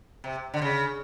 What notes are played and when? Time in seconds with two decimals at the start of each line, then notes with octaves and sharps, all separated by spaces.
0.24 C3
0.54 D3
0.62 C#3